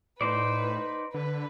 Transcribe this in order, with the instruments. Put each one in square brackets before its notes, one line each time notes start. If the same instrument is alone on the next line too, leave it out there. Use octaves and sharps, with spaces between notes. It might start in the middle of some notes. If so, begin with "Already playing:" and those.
[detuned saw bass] A2 [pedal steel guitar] D#4 C5 D5 [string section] B4
[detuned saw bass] D3 [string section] B4